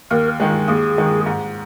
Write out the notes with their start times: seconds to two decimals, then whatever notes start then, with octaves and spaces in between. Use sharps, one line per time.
0.11 D#2 A#4
0.40 D#3 G#3
0.68 D#2 G#4
0.98 D#3 G#3
1.26 G#2